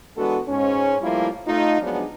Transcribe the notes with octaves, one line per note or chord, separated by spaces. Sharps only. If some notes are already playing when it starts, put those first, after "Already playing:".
E3 G#3 B3 D4 F#4 A4
G#2 C#4
F3 G3 A3 A#3 E4 F4
A3 D#4 F4
F3 F#3 G#3 B3 D4